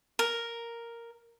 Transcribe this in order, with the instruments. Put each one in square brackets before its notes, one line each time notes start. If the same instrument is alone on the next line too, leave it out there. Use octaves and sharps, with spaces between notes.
[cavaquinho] A#4